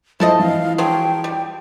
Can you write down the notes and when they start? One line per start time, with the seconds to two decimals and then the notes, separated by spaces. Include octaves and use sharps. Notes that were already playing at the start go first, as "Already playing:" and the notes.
0.20 F3 E4 A4 C5 D#5
0.39 E3 F5
0.78 F3 F#3 G#4 G5
1.24 G3